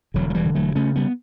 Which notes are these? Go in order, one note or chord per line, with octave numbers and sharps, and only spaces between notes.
E1 D3 F#3
F#3
E3 G3
D3
F#3 A3
C#3 A3 C#4
G3 B3